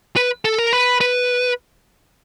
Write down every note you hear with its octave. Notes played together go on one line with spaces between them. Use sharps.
B4
A4
A#4
B4
B4